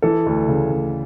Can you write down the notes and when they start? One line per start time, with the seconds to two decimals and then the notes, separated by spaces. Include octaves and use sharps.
0.02 E3 A4
0.26 D2
0.48 C#3
0.72 D2